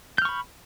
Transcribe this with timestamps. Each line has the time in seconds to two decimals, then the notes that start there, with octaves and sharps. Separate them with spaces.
0.18 G6
0.22 F6
0.25 C#6
0.29 B5